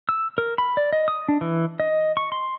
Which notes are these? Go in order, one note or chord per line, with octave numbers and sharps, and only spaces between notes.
E6
A#4
B5
D5
D#5
D#6
D4
E3
D#5
C#6
C6